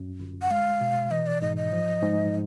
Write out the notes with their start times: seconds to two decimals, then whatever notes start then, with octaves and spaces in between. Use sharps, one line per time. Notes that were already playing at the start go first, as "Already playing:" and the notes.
Already playing: F#2
0.20 G1
0.42 F#5
0.51 G#3 F5
0.81 B2
1.11 E3 D#5
1.27 D5
1.41 G#2 D#5
1.57 D#5
1.72 F3
2.02 G#2